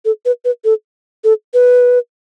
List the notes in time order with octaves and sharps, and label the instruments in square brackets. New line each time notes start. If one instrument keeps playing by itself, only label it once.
[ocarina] A4
B4
B4
A4
A4
B4